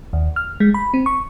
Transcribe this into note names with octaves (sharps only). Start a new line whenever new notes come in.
D#2
F6
G#3
B5
C4
C#6